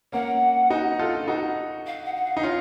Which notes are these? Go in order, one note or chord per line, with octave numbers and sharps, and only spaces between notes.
A#3 C#4 F#5
D#4 F#4
F4 A4
D#4 F#4
F5
F#5
F#5
F5
D#4
C#4 F4